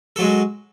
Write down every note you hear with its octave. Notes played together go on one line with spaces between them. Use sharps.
F#3 G#3 A4